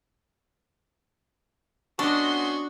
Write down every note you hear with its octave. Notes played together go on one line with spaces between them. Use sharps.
B3 C#4 D4 F#4 D#5 C6 C#6